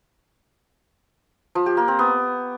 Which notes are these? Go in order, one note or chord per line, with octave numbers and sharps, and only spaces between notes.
F3
G4
A#3
C4
B3